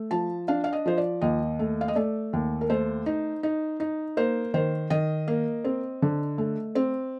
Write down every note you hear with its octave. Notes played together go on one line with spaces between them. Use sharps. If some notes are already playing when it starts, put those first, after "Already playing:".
Already playing: A3
F3 A5
D4 F5
F5
D#5
F3 C5
D5
D#2 D#5
A3
F5
D#5
A3 D5
D#2
A#4
A3 C5
D#4
D#4
D#4
A#3 C5
D#3 C5
D#3 D#5
A#3
C4
D3
A3
C4